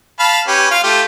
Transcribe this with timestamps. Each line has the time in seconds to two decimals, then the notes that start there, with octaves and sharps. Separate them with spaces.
0.19 F5 A5 B5
0.47 C#4 G4 B4
0.71 F4 F5
0.83 A3 F4 G4